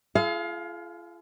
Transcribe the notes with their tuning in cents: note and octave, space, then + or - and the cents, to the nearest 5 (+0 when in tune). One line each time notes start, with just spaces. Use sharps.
F4 -40 G#4 +40 F5 +20